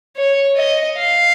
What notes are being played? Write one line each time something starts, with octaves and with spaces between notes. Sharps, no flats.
C#5
D#5
F5